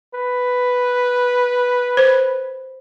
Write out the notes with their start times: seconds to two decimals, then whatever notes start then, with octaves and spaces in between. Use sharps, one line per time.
0.14 B4
1.97 C5